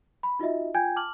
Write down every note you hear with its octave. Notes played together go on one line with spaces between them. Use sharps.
B5
D#4 F4 F#4 D#5 E5
F4 G5 G#5 G6 G#6
A5 D6 F6 F#7